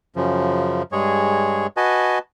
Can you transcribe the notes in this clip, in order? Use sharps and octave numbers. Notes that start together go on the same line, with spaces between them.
F#2 C#3 F3
G2 G#3 G#4 C#5
F#4 B4 D#5 G#5 A5